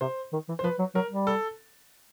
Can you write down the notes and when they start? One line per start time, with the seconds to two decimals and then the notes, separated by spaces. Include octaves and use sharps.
0.01 C3 C5
0.33 D#3
0.49 E3
0.59 C5
0.63 F3 B4
0.79 F#3
0.95 F#3 A#4
1.10 G3
1.27 A4